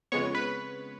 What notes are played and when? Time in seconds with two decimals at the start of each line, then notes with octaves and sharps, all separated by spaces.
0.12 F2 C#3 G#3 B3 C#5 C#6
0.35 B4 B5